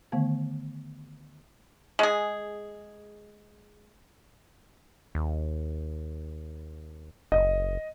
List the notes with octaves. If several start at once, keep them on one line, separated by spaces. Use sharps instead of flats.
D3 D#3 A3 B3 F5
G#3 G#4
D#2
F#1 D#5